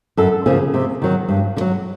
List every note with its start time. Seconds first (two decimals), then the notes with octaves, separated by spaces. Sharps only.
0.17 F#2 A4
0.46 C#3 F3 A#3 G#4
0.74 C3
1.02 D#3 F#3
1.28 G2
1.57 D3
1.61 F#3